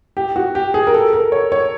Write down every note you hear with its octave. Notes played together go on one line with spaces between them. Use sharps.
G4
F#4
G4
G#4
A#4
A4
A#4
C#5
C#5